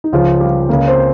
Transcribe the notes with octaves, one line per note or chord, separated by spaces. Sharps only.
D#4
C#2 C#3 F3 F4
G3 G4
C#2 C#3 A#3 A#4
C4 C5